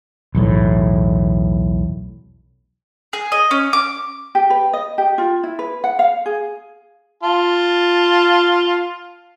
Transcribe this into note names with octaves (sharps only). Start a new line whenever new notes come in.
B1 E2 A2
G#4
D#5
C#4
D6
G4
B4
D#5
G4
F4
E4
B4
F#5
F5
G#4
F4 A5